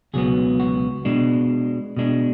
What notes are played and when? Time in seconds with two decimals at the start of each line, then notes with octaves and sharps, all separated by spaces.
0.14 C#2 B2 F#3 B3 G#4
0.60 F#4
1.05 B2 G#3 D4
1.97 B2 G#3 D4